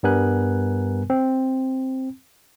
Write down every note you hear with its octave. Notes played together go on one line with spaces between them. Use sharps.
G2 G3 B3 A#4 G#5 F#6
C4